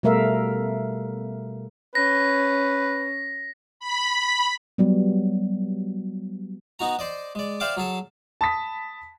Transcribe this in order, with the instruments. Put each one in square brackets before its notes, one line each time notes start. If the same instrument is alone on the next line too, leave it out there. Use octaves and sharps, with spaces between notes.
[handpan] B2 G3 A3 A#4 E5 F5
[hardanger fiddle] C#4 [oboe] B4 [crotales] A#6
[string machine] B5
[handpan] F#3 G3 B3
[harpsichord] B3 D#4 F#4 A#5
C5 D5 D#5
G#3 D5
C5 D5 E5 F5 G5 D6
F#3 G#4 A4 A5
[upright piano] A5 B5 D#6 B6